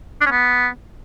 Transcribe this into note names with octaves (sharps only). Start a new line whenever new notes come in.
D4
C#4
B3